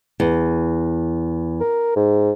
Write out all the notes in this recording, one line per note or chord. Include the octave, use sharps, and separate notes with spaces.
E2
A#4
G#2